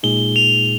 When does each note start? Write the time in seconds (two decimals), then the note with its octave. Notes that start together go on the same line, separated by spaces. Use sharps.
0.03 A#2 G#3 D#4 G#4 G7
0.36 F7